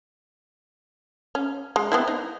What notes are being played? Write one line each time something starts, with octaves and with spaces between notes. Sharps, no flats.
C#4
G#3
B3 C4 E4
D#4